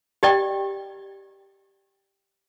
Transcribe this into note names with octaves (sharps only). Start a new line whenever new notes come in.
G4 D5 D#5 G5